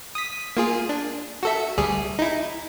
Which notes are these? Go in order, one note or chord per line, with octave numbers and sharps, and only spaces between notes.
D#6 B6
A#3 F4 G#4
D4
F#4 A4 E5
D2 G3 G#4
D#4 E4